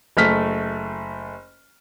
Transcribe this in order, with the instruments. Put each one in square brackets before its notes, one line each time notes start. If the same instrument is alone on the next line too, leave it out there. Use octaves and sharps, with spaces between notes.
[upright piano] F#1 A3 F6 B6